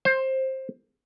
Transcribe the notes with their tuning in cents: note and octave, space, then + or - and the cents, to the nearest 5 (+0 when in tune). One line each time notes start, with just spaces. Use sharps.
C5 +15